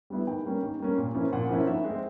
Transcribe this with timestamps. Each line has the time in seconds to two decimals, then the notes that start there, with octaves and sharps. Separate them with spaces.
0.10 G3 B3 E4
0.27 D#3 G5
0.45 G3 A#3 C#4
0.63 D#3
0.80 G3 A#3 C#4
0.98 A#2
1.14 F3 A#3 C#4 E4
1.33 A#2 F#5
1.49 F3 A#3 C#4 E4
1.67 D#3 E5
1.84 G#3 C4